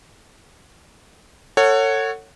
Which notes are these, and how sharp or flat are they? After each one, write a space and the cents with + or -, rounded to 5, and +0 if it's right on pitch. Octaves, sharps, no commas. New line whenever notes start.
A4 +35 C#5 -5 F#5 +0